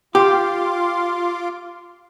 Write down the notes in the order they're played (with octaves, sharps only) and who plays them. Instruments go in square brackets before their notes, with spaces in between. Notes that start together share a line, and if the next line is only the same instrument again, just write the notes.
[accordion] F4 C6 D6 [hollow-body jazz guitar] G4